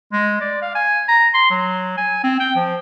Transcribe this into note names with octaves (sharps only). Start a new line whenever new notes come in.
G#3
D5
F5
G#5
A#5
C6
F#3
G#5
C4
G5
F3